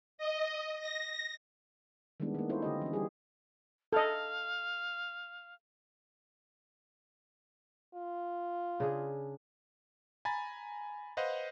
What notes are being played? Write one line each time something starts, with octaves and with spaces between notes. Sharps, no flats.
D#5
A#6
D#3 G3 G#3 B3 D4 E4
D#3 A#3
C#4 E4 F4 A4 C5 C#5
D3 G4 D#5
E3 C#4
G3 G4 G#4
A4 D#5 F5
F4
C#3 D4 G#4
G#5 A#5 B5 A6
B4 C5 D#5 F5 F#5